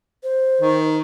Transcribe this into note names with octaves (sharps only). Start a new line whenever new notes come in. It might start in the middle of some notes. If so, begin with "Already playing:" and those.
C5
D#3